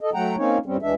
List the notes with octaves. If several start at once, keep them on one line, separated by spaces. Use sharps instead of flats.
A4 D#5
F#3 A3 F#5 G5 A#5
A#3 C4 C#4 D#4 C#5
G2 G3 C4 C#4
D2 E3 G#3 D4 E5